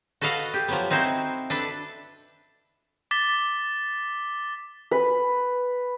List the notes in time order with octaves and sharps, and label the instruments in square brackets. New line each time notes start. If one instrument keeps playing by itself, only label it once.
[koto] F#4 A4 B4 D#5 F5 F#5
G4
F3 F#3 B3
C4 D#4 E4 F#4 C5
D4 A4 B4
[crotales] D6 A6 B6 G7
[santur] B4